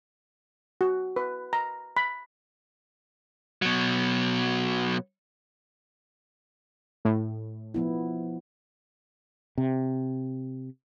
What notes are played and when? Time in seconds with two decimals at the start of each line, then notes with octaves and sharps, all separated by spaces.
0.81 F#4
1.16 B4
1.53 A#5
1.97 B5
3.62 B2 F#3
7.05 A2
7.74 F3 B3 E4
9.58 C3